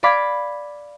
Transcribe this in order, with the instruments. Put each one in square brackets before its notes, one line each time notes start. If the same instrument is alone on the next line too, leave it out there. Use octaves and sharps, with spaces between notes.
[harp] D5 F5 B5 D6 G#6 B6